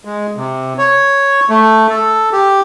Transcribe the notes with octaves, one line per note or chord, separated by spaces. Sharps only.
G#3
C3
C#5
A3
A4
G4